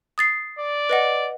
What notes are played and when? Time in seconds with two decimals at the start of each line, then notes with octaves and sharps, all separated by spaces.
0.18 D#6 A6 C7
0.59 D5
0.90 B4 D#5 F#5